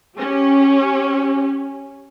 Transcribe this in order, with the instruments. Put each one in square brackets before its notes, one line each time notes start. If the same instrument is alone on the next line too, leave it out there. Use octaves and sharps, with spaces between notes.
[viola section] C#4 G4